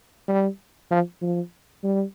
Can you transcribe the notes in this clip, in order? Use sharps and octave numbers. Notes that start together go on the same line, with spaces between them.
G3
F3
F3
G3